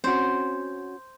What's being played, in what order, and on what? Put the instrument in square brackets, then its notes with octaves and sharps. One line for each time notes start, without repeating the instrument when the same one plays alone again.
[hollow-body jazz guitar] C4 C#4 F#4 [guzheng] C5